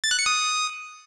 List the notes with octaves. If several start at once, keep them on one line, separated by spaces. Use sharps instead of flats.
A6
F#6
C#7
D#6